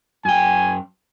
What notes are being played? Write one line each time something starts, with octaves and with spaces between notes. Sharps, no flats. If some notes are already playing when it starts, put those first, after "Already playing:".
F#2 G5 G#5